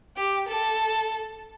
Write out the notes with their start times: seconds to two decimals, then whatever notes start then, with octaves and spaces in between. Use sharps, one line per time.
0.17 G4
0.48 A4